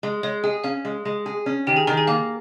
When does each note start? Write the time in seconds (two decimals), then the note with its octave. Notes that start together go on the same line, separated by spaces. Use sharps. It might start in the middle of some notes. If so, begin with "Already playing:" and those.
0.03 G#3
0.23 G#3 C#5
0.43 G#4 D#5
0.64 C#4 F5
0.85 G#3
1.05 G#3
1.26 G#4
1.46 C#4
1.67 D#3 G4 G5
1.76 G#4 G#5
1.87 D#3 A#4 A#5
1.97 G#4 G#5
2.07 A#3 F5